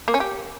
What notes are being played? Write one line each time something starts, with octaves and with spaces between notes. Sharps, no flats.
A#3
C#4
G4